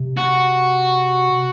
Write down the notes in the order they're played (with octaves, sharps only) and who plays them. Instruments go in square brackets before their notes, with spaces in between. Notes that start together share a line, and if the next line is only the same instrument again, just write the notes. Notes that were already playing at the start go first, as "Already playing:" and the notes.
Already playing: [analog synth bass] C3
[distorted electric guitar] F#4